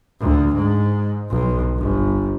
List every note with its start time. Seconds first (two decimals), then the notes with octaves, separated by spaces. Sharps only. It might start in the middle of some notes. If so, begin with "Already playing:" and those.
0.20 D2
0.55 G#2
1.30 B1
1.78 G1